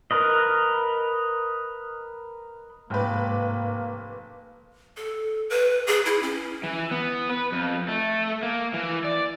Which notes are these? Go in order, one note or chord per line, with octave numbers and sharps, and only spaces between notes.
A#4 B4 D#5
F1 G#2 A#3 B4 G5
A4
B4
G#4
E4
C#4
E3
B3
B4
F2
A3
A#3
E3
D5